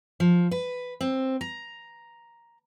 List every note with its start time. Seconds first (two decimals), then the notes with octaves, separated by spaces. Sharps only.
0.20 F3
0.51 B4
1.01 C4
1.41 A#5